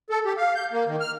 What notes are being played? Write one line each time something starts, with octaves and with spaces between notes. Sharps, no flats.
A4
G4
F5
G6
A#3
D#3
F6